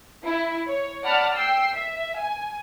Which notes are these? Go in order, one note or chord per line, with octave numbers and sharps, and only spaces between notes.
E4
C#5
D5 F#5 A5 B5 F6
G5 E6 C7
E5
G#5